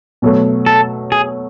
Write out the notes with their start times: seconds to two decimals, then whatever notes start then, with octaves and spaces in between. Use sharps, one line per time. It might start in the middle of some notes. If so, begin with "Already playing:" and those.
0.22 B2 F#3 A3
0.66 A4
1.12 G#4